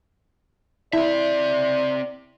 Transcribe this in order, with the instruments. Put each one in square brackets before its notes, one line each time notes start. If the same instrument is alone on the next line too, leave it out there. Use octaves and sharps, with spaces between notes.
[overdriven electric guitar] C4 E5 [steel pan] E4 [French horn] D5